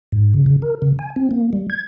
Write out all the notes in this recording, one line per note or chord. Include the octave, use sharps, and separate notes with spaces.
G#2
C#3
C#3
A#4
C#3
G#5
C4
A#3
G3
G#6